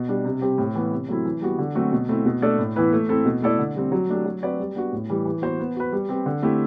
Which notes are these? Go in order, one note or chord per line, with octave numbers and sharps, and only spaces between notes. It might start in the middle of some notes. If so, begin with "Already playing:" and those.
Already playing: B2
G3 D4
C3
G3 C4 G4 C5
A2
E3 B3
C3
F#3 A3 C4 E4
E3
G3 B3 F#4
D3
F#3 A3 C4 F#4
B2
A3 C4 E4
B2
A3 D4 A4 D5
A2
E3 B3 E4 B4
A3
C4 E4 A4
B2
A3 E4 A4 D5
D3
G3 C4
F#3
A3 D4 G4
F#3
C4 F#4 B4 D5
G3
B3 D4 F#4
A2
E3 G3
E3
B3 F#4 C5
B3
F#4 B4
G3
C4 G4 B4
D3
A3 C4 E4 G4